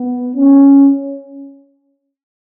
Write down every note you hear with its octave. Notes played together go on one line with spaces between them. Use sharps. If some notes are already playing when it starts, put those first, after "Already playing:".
Already playing: B3
C#4